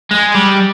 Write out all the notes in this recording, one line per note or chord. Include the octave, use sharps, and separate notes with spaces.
G#3
G3